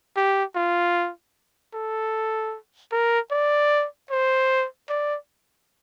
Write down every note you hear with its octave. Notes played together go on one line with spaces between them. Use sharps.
G4
F4
A4
A#4
D5
C5
D5